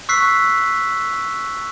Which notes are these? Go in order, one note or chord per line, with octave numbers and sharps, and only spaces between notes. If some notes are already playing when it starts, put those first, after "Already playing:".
C#6 E6 F#6 B6 C7